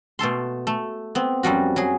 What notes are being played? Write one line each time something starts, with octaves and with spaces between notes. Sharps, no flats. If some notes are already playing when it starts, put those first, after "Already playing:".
B2 A3 A4 C6
A3
B3 C4
F#2 F3 G3 F#4
F#3 G#4